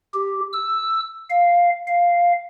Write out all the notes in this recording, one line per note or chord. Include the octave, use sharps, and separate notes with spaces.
G4
E6
F5
F5